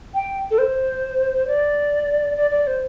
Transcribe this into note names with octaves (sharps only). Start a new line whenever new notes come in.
G5
A4
C5
D5
D5
D5
C5